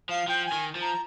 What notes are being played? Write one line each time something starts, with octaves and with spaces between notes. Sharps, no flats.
F3 F5
F3 G5
G#5
D#3
F3
A#5